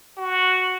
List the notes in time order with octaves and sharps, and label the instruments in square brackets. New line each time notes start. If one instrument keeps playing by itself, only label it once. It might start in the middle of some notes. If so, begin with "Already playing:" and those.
[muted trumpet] F#4